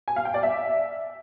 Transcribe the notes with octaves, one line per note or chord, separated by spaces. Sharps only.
G#5
F5
G5
D5
E5